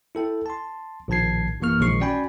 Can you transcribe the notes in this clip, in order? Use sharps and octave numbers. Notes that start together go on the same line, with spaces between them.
E4 A4 G5
A5 C6
A#1 A2 D#3 A5 G#6 C7
A1 F#2 E3 A#3 C#6 F6
A#1 A#2 D#3 G#3 C#6 C7
C#4 F#4 D5 G5 G#5 B5